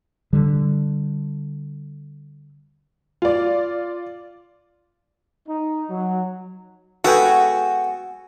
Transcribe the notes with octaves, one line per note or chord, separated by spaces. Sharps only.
D3 G3
F4 D5
D#4
F#3
G#3 B3 F#4 G#4 A4 B4 G5